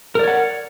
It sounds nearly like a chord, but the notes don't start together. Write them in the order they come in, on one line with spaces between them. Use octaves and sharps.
A#4 D5 C#5 F#5